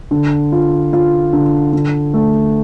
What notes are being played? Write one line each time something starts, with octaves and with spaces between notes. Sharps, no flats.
D3
F4
F4
D3
D3
A3